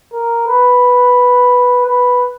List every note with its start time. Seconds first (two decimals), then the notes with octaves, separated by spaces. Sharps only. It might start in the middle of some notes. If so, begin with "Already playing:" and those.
0.13 A#4
0.48 B4
1.87 B4